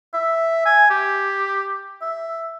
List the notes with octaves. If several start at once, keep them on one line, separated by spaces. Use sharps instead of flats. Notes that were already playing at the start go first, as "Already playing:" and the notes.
E5
G#5
G4
E5